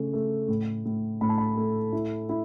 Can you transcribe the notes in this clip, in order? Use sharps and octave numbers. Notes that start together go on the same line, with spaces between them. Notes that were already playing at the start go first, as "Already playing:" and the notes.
Already playing: C#3 A3
A3
A2
A2
A2 B5
A5
B5
A3
E4
E4